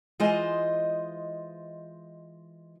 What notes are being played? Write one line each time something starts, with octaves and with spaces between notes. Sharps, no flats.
E3 G#3 F4 C5 D#5 G#5